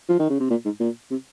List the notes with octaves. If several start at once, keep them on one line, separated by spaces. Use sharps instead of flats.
F3
D#3
C#3
C3
A#2
G#2
A#2
C3